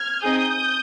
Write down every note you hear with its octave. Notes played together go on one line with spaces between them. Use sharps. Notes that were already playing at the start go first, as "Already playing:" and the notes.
Already playing: F6 G#6
C4 D#4 G#4 D#6 G6